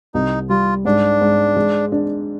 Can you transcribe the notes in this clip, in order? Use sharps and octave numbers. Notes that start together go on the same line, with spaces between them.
C2 D#4
G3 F4
G#2 D4
G#2
G#3
D4